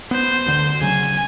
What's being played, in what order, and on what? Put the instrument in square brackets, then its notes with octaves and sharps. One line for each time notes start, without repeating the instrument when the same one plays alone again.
[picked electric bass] B3 [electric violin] C5
[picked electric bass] D2 D3
[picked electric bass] C#3 F#3 [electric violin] G#5